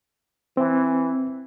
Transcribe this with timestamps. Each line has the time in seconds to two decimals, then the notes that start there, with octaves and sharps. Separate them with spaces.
0.57 E3 C4